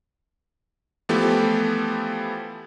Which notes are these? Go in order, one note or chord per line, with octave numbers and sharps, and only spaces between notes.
E3 F3 A3 B3 G4 A4